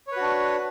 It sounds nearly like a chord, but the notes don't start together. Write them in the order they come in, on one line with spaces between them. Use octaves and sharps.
C#5 B4 F#4 D4